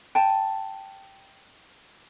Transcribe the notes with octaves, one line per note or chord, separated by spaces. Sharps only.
G5 A5